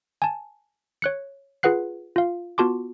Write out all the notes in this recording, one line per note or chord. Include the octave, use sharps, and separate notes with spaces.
G#5 A5
C#5 F#6 C#7
F4 G#4 B4 F#5 F#6 C7
F4 F5
B3 F4 F#4 A5 C6 D6